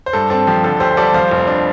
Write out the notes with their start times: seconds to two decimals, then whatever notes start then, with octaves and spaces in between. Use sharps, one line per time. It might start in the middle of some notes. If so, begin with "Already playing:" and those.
0.06 C5
0.13 G2 A4
0.30 C4 A4
0.47 F3 G4
0.64 D3 A4
0.80 D2 G4 C5
0.97 G3 A4 D5
1.14 F3 C5 F5
1.31 F1
1.47 D4